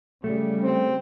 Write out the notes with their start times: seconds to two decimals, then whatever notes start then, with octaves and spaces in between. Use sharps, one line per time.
0.24 C#3 G3 A3
0.63 C4